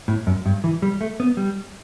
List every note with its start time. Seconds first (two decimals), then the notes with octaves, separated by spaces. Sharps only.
0.08 A2
0.27 F#2
0.46 G2
0.64 E3
0.82 G3
1.01 A3
1.20 B3
1.37 G3